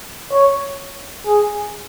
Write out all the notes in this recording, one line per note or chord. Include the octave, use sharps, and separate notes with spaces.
C#5
G#4